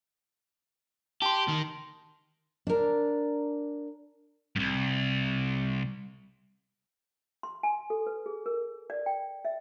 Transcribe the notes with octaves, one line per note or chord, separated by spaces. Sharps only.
G4 A5 C6
D#3 D#4
D4 A#4
C2 G2
C6
G#5
A4
B4
G#4
A#4
D5
G5
E5